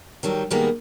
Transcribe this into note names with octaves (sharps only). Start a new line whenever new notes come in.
D#3 F#3 G3 A4
B2 D#3 G3 G#3 A#3 B3